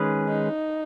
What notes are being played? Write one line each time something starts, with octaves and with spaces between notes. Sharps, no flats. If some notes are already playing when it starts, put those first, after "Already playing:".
Already playing: D#3 G#3 C#4 G#4 B4
D#4